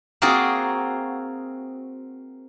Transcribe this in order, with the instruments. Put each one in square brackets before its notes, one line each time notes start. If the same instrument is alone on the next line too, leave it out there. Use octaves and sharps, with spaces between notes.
[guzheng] A#3 C4 F4 F#4 G#4